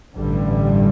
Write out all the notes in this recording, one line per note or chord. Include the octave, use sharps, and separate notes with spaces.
A1 G2 D3 G3